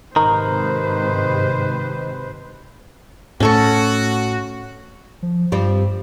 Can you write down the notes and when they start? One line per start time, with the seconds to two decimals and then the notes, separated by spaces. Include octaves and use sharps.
0.16 G#2 C3 D#3 B4 C5 A#5
3.40 A2 A3 C#4 F#4 A4 C#6
5.23 F3
5.52 G2 F3 G3 C4